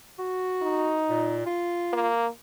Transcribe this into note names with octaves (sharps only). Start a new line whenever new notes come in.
F#4
D#4
A#2
F4
A#3